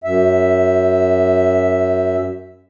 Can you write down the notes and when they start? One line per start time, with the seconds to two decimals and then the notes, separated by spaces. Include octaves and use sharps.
0.04 F#2 E5